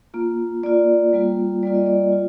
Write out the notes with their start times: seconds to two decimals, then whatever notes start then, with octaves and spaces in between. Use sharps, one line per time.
0.14 A#3 F4
0.63 A#3 F4 D5
1.13 G3 A#3 F4
1.63 G3 A#3 F4 D5
1.75 D#5
1.86 D5
2.12 F4